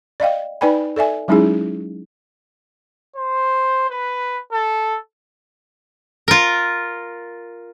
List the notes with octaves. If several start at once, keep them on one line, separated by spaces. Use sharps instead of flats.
D5 D#5 F5 G5
D#4 B4 D5 G5 G#5 B5
A4 D5 E5 G#5
F#3 G#3 C#4 D#4 E4 G#4
C5
B4
A4
F4 A#4